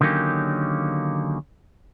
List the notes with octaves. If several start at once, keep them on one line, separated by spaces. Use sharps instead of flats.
D3 D#3 F#3 A#3 C#4 G4